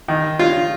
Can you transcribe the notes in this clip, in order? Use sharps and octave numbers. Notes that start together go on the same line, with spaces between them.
D#3
F4